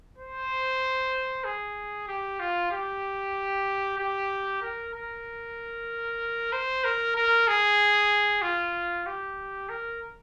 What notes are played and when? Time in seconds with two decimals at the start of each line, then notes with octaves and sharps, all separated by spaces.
0.18 C5
1.44 G#4
2.08 G4
2.40 F4
2.71 G4
3.98 G4
4.62 A#4
4.94 A#4
6.52 C5
6.84 A#4
7.15 A#4
7.48 G#4
8.42 F4
9.06 G4
9.69 A#4